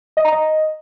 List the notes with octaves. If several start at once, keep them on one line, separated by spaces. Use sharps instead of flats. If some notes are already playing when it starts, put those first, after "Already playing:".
D#5
A#5
D#5